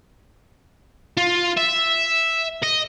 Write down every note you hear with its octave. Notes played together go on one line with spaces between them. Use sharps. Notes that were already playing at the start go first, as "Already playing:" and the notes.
F4
E5
D#5